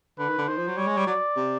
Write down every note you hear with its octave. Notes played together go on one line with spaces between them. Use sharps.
D3 B4
D#3
D3
D#3 C5
F3
F#3
G3 C#5
G#3
G3
F#3 D5
C3